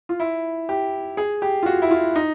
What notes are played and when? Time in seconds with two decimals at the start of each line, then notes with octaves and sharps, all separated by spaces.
0.09 F4
0.20 E4
0.69 G4
1.17 G#4
1.42 G4
1.63 F4
1.66 F#4
1.82 E4
1.91 F4
2.16 D#4